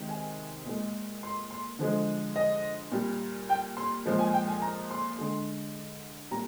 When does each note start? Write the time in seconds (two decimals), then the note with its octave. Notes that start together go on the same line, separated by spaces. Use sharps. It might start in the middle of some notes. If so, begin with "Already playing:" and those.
Already playing: C3 D#3 G#3
0.09 G#5
0.66 A#2 G#3
1.23 C6
1.51 C6
1.79 D3 F3 G#3
2.36 D#5
2.92 A#2 G3
3.49 G5
3.77 C6
4.06 A#2 F3 G#3
4.19 G#5
4.33 G5
4.48 G#5
4.62 A#5
4.91 C6
5.18 D3 G#3
6.31 A#2 G3 A#5